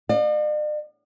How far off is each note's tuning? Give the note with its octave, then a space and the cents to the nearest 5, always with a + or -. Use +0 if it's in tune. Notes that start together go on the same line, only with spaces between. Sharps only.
D5 +45 F5 +40